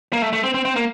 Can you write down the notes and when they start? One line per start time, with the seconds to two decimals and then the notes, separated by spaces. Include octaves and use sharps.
0.13 A#3
0.22 A3
0.33 A3
0.44 C4
0.54 C4
0.65 C4
0.76 A#3